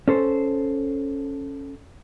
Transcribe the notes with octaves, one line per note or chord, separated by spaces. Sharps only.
C#4 A4 C5